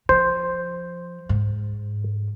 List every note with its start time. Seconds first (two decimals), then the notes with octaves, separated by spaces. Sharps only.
0.09 F3 C5
1.29 G#2